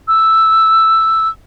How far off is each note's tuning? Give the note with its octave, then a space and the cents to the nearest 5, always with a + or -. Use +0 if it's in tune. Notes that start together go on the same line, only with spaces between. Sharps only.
E6 +0